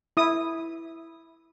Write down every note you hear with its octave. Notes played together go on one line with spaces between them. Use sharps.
E4 D#6